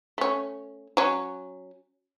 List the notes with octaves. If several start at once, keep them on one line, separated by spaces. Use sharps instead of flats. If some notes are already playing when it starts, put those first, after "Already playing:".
A3 C#4
F#3 C#4